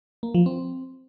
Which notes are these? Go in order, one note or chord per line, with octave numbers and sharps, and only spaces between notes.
A#3
F3
C4